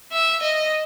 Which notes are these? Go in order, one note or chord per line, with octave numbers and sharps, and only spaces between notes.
E5
D#5